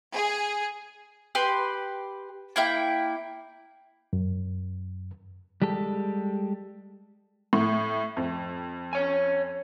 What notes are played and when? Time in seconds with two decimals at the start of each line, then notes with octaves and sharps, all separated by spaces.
0.14 G#4
1.35 G4 B4 C6
2.56 A#3 E4 G5
4.13 F#2
5.62 G3 G#3 G4 A4
7.53 A2
8.17 F2
8.93 C#5 G#5